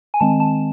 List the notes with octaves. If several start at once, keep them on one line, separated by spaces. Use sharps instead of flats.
G#5
D#3 G#3 C4 A5
A5